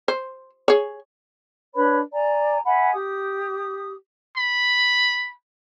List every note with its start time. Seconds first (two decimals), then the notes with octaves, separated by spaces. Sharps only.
0.08 C5
0.68 G#4 C#5
1.74 D4 B4 C#5 B5
2.13 D5 G#5 A#5
2.66 E5 F#5 G#5 B5
2.93 G4 D#6
4.37 B5